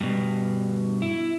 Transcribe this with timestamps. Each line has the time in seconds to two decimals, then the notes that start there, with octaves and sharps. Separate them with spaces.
0.01 G2 B2
1.02 E4